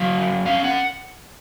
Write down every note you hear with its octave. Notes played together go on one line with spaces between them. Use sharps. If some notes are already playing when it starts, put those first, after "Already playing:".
Already playing: F#3 F5
F#2
C#4 F5
F#5